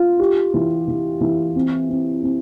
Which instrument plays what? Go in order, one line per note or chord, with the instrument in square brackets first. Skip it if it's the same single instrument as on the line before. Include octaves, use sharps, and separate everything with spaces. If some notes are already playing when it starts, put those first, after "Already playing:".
Already playing: [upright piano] F4
G4
E3
E3
E3
C4
C4
C4